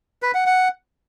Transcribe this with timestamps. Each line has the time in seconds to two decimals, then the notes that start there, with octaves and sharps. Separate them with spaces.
0.22 B4
0.34 F#5
0.46 F#5